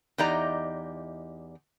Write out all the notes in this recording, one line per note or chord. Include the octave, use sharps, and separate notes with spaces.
E2 D#4 G4 D5 D#5 A#5